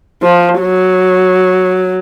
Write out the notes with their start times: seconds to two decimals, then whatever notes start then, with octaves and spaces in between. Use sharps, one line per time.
0.23 F3
0.60 F#3